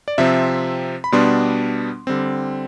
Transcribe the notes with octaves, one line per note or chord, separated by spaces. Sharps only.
D5
C3 F3 C4 E5
B5
B2 G3 B3 D4 C6
D3 G3 C4